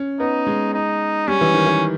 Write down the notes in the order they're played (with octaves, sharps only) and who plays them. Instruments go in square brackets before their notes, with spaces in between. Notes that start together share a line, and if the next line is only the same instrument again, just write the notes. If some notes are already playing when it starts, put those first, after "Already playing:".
Already playing: [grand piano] C#4
[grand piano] B3 [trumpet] D#4
[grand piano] G#3
[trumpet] D#4
[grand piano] G3 [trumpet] C#4
[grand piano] E3
D#3
E3